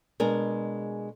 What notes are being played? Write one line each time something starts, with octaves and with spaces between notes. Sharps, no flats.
B2 G#3 D4 G#4 A#4